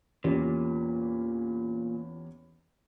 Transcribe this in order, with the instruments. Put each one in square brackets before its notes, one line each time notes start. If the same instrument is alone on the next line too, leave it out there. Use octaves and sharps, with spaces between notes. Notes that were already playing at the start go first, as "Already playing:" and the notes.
[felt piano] E2 C#4 G4 [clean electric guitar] A#2